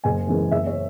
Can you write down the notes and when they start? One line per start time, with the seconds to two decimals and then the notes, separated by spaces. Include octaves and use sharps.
0.04 F#1 G#5
0.27 F#2 E3 G#3
0.51 F#1 E5
0.67 C#5